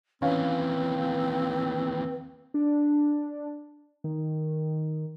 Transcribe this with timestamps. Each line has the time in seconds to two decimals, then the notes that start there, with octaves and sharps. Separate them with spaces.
0.22 D#2 E3 C4 C#4 B4 F5
2.54 D4
4.04 D#3